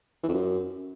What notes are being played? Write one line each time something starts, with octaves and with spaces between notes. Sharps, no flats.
E3
F2
F#2